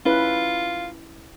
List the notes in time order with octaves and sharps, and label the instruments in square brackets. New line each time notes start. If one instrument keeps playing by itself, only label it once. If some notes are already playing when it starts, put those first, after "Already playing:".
[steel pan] C#4 E4 B4 [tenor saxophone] F4